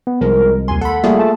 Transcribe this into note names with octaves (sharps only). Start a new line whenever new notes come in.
B3
C2 F3 G#3 A#4
D#2 G#5 C6
A4 F#5 B5
G3 A3 A#3 F4 G#4
A3 A5